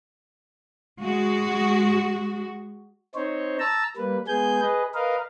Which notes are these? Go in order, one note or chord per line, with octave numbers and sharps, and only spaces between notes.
G#3 F#4
C4 D#4 C5 C#5
A5 A#5 E6
G3 A#3 B4
G#3 B3 G#4 G#5 G6
G#4 B4 D#5
A#4 B4 D#5 F5